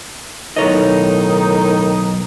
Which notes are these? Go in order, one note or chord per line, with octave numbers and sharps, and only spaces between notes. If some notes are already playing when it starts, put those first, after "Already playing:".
B1 A2 D#3 D#4 C#5 D#5